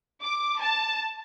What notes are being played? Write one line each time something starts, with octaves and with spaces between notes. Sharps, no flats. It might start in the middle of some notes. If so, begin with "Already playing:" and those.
D6
A5